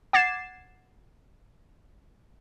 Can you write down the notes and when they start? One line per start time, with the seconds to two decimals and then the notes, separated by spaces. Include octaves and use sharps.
0.13 F#5 D6 G#6 A6 C7 E7